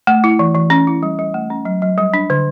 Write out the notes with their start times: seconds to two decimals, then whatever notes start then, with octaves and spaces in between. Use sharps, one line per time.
0.07 A3
0.24 E4
0.39 E3
0.55 E3
0.70 C#4
0.87 E4
1.03 G3
1.19 G3
1.34 A3
1.50 C#4
1.65 F#3
1.82 F#3
1.98 G3
2.14 D4
2.30 D3